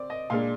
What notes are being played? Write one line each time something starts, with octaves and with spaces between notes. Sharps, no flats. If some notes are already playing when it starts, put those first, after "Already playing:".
Already playing: C4 D5
D#5
A#2 G#3 D4 F5